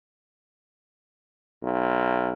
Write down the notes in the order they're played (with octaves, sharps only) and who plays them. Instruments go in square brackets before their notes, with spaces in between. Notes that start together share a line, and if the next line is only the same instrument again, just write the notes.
[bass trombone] B1